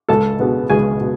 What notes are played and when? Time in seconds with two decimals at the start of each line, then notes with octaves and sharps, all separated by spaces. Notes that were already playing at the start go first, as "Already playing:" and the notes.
0.09 C#2 A4 A5
0.39 B2 G#3 B3
0.70 C#2 G#4 G#5
1.01 B2